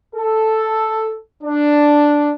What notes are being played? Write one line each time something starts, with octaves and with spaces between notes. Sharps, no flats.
A4
D4